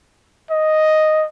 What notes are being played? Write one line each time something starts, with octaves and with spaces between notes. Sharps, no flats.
D#5